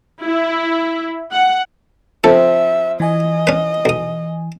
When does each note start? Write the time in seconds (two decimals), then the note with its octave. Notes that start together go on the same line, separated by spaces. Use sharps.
0.24 E4
1.32 F#5
2.24 F3 C4 A4 E5
3.00 E3 D#5 G#5
3.47 C#4 B4
3.85 B1 D#6